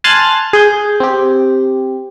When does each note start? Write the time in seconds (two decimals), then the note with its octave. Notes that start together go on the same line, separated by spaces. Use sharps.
0.04 G#5 A5 C6 F6 F#6 A6
0.53 G#4 G6
1.00 C4 G4